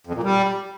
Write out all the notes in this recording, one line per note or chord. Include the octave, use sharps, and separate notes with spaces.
F2
A#2
G3